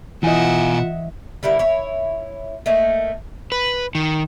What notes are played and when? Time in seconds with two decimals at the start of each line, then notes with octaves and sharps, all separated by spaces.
0.23 B2 E3 F4 D#5 E5 F#5 G#5
1.43 D3 G3 E4 A#4
1.59 E4 C#5
2.66 A3 A#3 D#4
3.52 B4
3.95 D#3